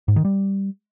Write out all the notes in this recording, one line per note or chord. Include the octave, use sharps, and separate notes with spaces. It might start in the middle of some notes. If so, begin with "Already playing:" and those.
G#2
D#3
G3